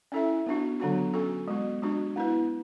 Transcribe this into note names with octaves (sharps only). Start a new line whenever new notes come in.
C#4 E4 A4 E5
B3 D4 F#4
D3 F#3 B3 D4 F#4
C#4 F#4 A4
G#3 B3 F#4
G#3 D4 F#4
B3 E4 B4